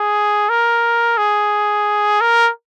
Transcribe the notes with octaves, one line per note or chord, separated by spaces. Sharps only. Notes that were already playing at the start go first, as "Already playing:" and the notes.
Already playing: G#4
A#4
G#4
A#4